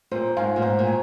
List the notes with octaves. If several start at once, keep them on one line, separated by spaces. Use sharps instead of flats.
A#2 C5
G#2 F5 G#5 C6
A#2
G#2 C5
A#2
G#5